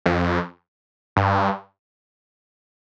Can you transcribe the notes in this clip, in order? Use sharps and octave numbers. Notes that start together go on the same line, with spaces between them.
F2
G2